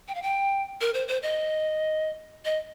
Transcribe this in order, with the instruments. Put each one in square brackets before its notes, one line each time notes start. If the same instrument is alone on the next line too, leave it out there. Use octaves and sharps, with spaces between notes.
[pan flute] G5
F5
G5
A#4
C5
C5
D#5
D#5